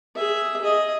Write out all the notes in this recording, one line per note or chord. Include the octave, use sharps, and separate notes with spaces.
G#4 E5
G#4 D#5